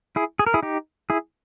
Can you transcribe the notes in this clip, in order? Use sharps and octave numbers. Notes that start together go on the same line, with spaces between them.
E4 G#4
G#4
A#4
E4 G#4
D#4 G4
E4 G#4